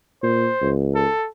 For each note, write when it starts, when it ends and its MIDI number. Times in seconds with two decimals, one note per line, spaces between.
0.23 0.48 46
0.23 0.72 72
0.61 1.06 37
0.95 1.28 69